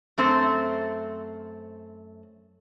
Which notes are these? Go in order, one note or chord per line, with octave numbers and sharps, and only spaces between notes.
F#2 A3 C4 C5